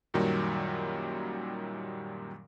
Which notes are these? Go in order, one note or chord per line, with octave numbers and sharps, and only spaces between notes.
F#2 A#2 D#3 F#3 G3